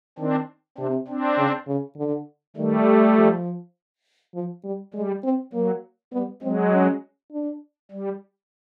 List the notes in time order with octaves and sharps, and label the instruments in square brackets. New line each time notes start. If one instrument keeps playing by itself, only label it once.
[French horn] D#3 [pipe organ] C4 D4
[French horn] C3 [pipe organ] C4 D4
[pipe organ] C4 D4
[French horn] C#3
C#3
D3
[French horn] D#3 [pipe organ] G3 A3
[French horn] F3
F3
G3
[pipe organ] G3 [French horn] G#3
[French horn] C4
[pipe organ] F#3 [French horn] A#3
[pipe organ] G3 [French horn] B3
[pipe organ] F#3 G#3 [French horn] C4
[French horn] C#4
D4
[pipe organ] G3